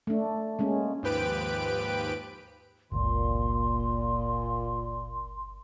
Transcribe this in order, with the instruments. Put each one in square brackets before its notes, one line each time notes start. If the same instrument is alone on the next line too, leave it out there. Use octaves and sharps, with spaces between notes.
[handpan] A3 D4
G#3 A#3 C#4
[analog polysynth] D#2 G#2 F3 G4 B4 D7
[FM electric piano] G1 C#2 [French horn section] A#2 [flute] C6